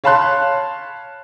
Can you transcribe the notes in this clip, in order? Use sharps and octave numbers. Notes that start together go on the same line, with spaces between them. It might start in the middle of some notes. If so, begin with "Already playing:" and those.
C#5 F5 A5 B5 C6 F#6